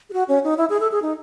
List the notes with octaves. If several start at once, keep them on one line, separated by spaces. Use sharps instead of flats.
G#4
F#4
C#4
D#4
E4
G#4
A4
G#4
D#4